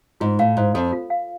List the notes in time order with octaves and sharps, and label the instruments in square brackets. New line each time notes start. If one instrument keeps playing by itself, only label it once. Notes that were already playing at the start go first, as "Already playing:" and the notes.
[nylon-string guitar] G#2 [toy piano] F4
[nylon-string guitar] A2 [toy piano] F5
[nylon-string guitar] G#2 [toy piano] C5
[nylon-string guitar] F2 [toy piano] A4
[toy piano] F4
F5